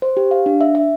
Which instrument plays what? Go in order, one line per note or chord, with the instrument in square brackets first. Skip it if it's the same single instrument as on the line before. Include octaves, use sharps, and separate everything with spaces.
[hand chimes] C5
G4
F5
D4
E5
E5